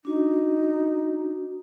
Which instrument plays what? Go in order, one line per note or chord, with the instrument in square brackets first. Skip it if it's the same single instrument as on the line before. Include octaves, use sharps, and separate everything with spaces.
[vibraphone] D4 F#4 [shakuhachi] D#4